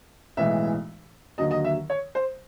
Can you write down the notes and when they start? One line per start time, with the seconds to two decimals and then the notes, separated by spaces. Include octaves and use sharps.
0.37 B1 A2 E3 G#3 E5
1.38 D#2 D3 F#3 D#5
1.51 D#5
1.64 E5
1.90 C#5
2.15 C5